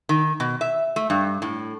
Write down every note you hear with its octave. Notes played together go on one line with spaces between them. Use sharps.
D#3
B2
E5
A3
G2
A2